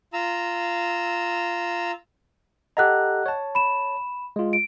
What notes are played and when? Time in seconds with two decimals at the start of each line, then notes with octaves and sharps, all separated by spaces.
0.13 F4 A#5 E6
2.77 G4 A4 D#5 F#5 A#5 F#6
3.26 C#5 A5
3.55 B5 E7
4.36 G#3 F4
4.53 D7